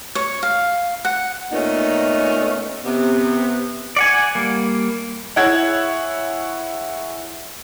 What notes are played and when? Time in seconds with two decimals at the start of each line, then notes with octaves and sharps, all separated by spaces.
0.15 C#5
0.43 F5
1.05 F#5
1.52 A#2 A3 B3 C#4 D#4
2.84 C3 B3
3.96 D5 F#5 G#5
4.35 G3 A#3
5.36 E4 G#4 C#5 E5 F#5 G#6